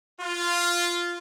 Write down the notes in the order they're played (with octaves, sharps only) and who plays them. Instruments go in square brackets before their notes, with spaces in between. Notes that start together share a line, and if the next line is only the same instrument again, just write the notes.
[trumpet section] F4